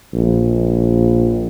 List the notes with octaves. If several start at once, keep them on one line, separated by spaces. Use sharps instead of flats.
A#1